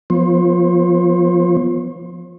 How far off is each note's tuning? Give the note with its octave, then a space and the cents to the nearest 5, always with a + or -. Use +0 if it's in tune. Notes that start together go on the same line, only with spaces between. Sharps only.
F3 +0 B3 +0 C5 +35